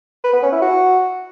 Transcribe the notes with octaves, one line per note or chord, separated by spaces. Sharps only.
B4
B3
C#4
E4
F#4